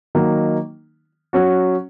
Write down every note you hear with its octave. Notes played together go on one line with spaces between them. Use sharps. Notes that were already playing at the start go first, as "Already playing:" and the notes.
D#3 F#3 A#3 D#4
F#3 C#4 F#4